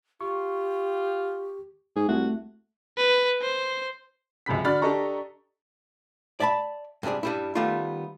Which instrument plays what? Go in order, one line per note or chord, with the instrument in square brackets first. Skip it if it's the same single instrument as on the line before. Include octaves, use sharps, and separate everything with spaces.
[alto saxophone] F4 [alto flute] G4 [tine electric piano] C#6
[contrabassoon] G#2 [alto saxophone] G#4
[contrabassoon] C2 [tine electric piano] A3 [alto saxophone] F#4
[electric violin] B4
C5
[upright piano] C#2 F#2 C3 B5 B6
D3 F#4 D5 B5 F6 A6
D4 G4 A4 D#5 A#5 C#6
[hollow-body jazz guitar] D5 E5 A5 B5
G2 C3 E3 G#4 D5
G2 G3 E4
D#3 G3 A3 B3 F4